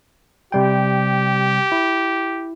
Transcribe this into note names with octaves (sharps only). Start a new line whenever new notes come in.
C3 G3 G4 G5
E4